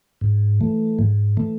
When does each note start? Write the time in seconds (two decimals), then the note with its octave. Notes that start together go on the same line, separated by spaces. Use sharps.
0.21 G#2
0.61 E3 A3
0.99 G#2
1.37 E3 A3